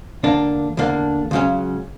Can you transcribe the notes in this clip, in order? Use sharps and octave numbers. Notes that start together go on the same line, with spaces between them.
E2 D3 A#3 D4
E2 D3 A#3 D4
C#2 C#3 F#3 C#4